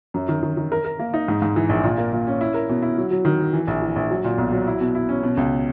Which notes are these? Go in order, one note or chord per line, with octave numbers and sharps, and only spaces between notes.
F#2
D#3
D#3
D#3
A#4
A#4
A#3
D#4
G#2
G#2
E3
A#1
A#2
A#3
A#2
C#4
E4
A#4
B2
E4
F#3
F#3
D#3
F#3
E3
A#1
E3
A#1
F#3
A#2
B1
F#3
E4
B2
E4
C#4
B2
C#2